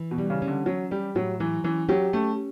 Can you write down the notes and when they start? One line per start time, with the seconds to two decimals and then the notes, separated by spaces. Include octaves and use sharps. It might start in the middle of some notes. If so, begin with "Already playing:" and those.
Already playing: E3
0.11 B2
0.18 G3
0.30 C#3
0.42 C#4
0.48 D3
0.66 F#3 C#4
0.91 G3 G4
1.15 A2 F#3
1.40 E3 F#3
1.64 E3 C#4
1.89 F#3 G4
2.13 A3 C#4